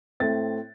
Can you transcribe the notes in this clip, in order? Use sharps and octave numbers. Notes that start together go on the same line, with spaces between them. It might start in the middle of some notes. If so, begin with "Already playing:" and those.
A2 A3 C4 A6